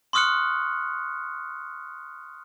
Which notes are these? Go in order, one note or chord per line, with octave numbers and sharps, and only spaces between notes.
C6 C#6 D#6 F6 F#6 C#7